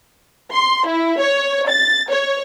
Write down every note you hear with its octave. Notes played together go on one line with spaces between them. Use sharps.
C6
E4
C#5
A6
C#5